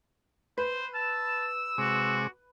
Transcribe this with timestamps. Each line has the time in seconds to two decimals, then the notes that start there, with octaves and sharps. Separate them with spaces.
0.58 B4 C5
0.95 A5 E6
1.78 C3 G#3 F#4 D6